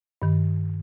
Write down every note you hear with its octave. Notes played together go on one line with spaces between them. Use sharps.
G2 D#3